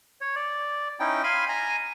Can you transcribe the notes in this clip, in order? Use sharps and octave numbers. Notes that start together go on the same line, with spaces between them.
C#5
D5
C#4 D#4 E4 G5
F5 G#5 B5 C6
G#5 A#5